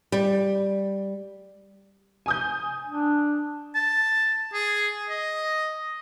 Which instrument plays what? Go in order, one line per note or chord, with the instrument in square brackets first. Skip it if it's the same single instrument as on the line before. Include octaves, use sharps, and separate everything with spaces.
[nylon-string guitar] G3
[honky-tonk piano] G#5 D#6 G6
[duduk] D4
[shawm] A5
G#4
D#5